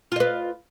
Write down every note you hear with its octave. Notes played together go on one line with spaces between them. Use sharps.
F4 B4 D#5